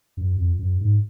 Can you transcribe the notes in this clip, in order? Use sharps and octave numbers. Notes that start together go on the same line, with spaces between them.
F#2
F2
F#2
G#2